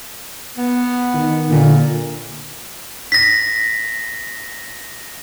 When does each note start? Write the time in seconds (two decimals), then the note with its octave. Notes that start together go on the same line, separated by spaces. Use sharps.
0.58 B3
1.14 D#3
1.50 A#2 D3
3.12 A#6 B6